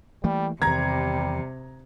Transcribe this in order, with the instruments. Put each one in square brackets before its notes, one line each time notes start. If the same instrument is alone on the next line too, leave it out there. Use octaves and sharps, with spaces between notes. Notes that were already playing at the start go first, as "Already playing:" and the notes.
[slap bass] E3 A3 A#3 [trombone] G3
[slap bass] E2 D#3 [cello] C3 [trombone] G3 [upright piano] A#5 G#6